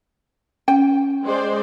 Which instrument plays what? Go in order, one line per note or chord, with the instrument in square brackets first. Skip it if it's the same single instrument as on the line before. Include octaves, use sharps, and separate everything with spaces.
[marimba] C#4 [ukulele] G5
[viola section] G#3 C5 D5